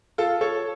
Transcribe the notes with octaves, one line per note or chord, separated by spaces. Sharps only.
F4 A4
A4 C#5